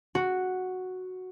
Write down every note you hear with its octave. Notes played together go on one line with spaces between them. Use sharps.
F#4